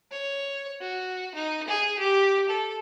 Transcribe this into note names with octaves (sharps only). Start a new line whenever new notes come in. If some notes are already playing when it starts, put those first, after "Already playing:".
C#5
F#4
D#4
G#4
G4
A4